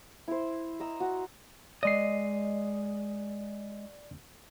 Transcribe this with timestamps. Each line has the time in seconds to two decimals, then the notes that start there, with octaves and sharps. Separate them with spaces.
0.28 E4 C5
0.80 D#5 A#5 E6
1.00 F#4
1.83 G#3 D5 D#5 C7